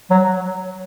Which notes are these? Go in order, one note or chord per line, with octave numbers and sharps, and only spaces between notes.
F#3